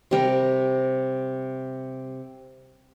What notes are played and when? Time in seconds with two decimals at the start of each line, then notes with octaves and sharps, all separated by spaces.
0.11 C3 G3 A#4